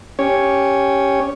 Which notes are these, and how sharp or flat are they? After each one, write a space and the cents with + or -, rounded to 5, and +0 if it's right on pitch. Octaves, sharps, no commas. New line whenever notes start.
C#4 +0 G4 +0 C#5 +0